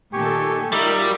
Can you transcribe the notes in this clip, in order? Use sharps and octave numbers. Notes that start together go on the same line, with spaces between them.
A#2 D#3 G4 A4 G#5 C#6
G3 D#4 F4 F#4 A#4 E5 G6